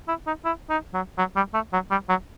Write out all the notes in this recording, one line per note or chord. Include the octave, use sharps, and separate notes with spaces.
E4
D#4
E4
D#4
F#3
F#3
G3
A3
F#3
G3
F#3